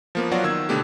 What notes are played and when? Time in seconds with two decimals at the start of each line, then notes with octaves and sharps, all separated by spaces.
0.15 F3 A#3 B3
0.31 F#3 B3 F4 F#4 D5 F5
0.44 D#3 E6 G#6
0.69 B2 D3 A3 B3 D4 G4